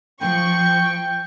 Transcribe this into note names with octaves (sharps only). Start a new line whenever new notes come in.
F3 G5 C#6